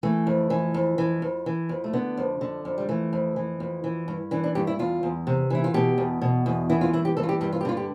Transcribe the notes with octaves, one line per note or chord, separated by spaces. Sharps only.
E3 A3
F2
E3
F2
E3
F2
E3
F2
A3
D3 B3
F2
D3
F2
G3
E3 A3
F2
E3
F2
E3
G2
E3 D4
D4
G2 G4
E4
E2 F4
E2
C3
E3 E4
F4
B2 G4
E2
B2
E2
E3 E4
F4
G2 E4
G4
E3 A4
F4
G4
G2 G4
F4
G4
D3 F4
G4